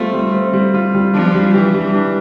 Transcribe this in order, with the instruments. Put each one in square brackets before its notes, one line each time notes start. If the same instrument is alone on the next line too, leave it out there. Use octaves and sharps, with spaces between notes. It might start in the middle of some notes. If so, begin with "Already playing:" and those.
Already playing: [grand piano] G3 C4 F4 [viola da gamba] A3
[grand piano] G3
C4
G3
F4
G3
[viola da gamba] F3 [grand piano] D4
[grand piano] G3
[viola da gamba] E3 [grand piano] G4
[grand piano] G3
D4